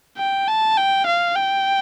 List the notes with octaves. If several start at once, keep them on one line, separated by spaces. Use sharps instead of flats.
G5
A5
G5
F5
G5